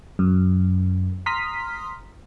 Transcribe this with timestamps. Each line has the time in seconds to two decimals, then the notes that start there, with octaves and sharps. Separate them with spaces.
0.19 F#2
1.26 A#5 C6 D#6 F6 B6